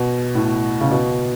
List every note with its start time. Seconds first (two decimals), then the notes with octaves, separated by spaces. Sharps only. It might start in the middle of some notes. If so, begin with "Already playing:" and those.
Already playing: B2
0.35 A2
0.81 C#3
0.91 B2